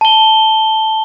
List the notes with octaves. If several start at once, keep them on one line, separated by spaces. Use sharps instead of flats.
A5 G7